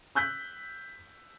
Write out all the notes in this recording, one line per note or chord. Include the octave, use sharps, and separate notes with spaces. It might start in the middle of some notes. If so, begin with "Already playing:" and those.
E6 F#6 G6 B6